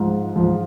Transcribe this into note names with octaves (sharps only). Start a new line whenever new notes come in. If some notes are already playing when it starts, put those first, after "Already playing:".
Already playing: G#2 F3
G#2 F3